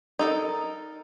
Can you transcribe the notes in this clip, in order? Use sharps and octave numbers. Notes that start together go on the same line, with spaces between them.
D#4 A4 A#4